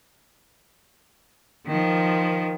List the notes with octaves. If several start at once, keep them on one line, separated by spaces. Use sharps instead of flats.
D#3 F3